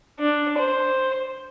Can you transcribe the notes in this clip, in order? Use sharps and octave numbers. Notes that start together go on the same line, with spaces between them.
D4
C5